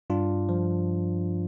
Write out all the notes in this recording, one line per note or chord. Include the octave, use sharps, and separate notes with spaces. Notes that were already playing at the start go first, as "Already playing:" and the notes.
G2 D4 F4
F3